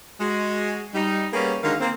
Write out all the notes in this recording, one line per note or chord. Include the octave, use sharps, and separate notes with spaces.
G#3 F#4
G3 D#4
G3 A#3 B3 C#4 G#4
D3 D#3 F#3 G#3 A#4 F5
A#3 C4